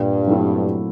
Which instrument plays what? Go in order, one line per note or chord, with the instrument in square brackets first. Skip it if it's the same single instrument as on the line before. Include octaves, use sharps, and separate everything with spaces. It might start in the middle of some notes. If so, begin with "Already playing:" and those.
Already playing: [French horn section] G2 [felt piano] A#2
[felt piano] F#3 A3 C4 E4